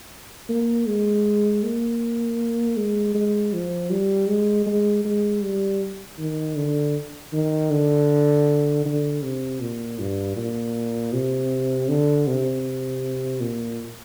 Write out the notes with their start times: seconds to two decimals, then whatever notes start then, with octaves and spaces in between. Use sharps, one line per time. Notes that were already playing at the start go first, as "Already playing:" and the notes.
0.49 A#3
0.87 G#3
1.63 A#3
2.77 G#3
3.14 G#3
3.53 F3
3.90 G3
4.28 G#3
4.66 G#3
5.05 G#3
5.42 G3
6.18 D#3
6.56 D3
7.33 D#3
7.71 D3
8.85 D3
9.23 C3
9.61 A#2
9.99 G2
10.36 A#2
11.13 C3
11.88 D3
12.27 C3
13.41 A#2